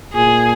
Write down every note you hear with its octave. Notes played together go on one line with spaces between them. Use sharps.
A#2 G#4